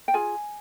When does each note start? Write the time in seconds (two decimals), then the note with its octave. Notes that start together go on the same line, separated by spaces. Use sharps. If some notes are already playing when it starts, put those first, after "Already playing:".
0.08 G5
0.14 F4 G#4 G#5